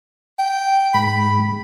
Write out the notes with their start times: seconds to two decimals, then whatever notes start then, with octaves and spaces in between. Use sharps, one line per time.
0.39 G5
0.94 G#2 B5